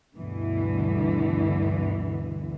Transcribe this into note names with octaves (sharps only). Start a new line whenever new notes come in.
D2 G2 B2 D3 E3